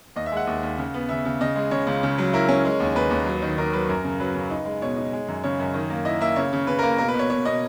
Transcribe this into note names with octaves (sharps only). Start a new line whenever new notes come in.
D#2 D#5
E5
G#3 F#5
D#2
D#2
C#3
B3
C#3 E5
C#3
C#3 D#5
G#3
C#3 C#5
C#2
C#3
F#3
E4 A#4
C#4
G#3
D#2
D#2 B4
D#2
F#3
D#3
D#3 A#4
F#3 B4
F#2 A#4
C#3
F#3 B4
C#3
D#4
G#3
B2 C#5
D#4
G#3
F#2
C#3 C#5
F#2
D#3
A#3
E4 D#5
A#3 E5
C#3 C#5
C#3
C#3 B4
A#4
A#3
B2 A#4
B4
B2
C#5
B2 C#5
B2 D#5